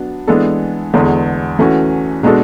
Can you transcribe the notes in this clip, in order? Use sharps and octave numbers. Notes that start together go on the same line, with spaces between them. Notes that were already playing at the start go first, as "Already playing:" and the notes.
Already playing: F#3 B3 D4
E3 G#3 B3 D4 A4
E2 D3 G#3 B3
E3 A3 C#4 F#4
B2 G#3 D4 F#4 A4